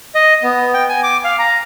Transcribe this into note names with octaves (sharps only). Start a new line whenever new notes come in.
D#5
B3
G5
G#5
D6
F5
A#5